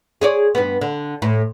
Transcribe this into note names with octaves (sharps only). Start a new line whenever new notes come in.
G#4 C#5 D5
G2 B3
D3
A2